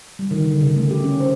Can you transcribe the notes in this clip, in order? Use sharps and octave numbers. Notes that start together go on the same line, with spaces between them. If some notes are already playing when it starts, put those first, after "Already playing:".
G3
D#3
D3
C#3
A3
G4
C#4
C5